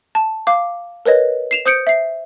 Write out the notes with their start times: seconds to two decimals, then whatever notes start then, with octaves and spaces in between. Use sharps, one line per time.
0.15 A5
0.47 F5 D6
1.05 A#4 B4 C#5 D#5
1.51 C7 E7 F7
1.66 C5 D#6 G6 C#7 D7
1.87 E5 C7